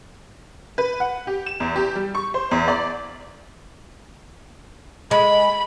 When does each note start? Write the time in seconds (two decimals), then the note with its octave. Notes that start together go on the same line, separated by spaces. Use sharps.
0.78 B4
1.00 F#5
1.27 G4
1.46 E7
1.60 E2
1.76 G4
1.95 G3
2.15 C#6
2.34 C5
2.51 E2
2.68 D5
5.11 G#3 B5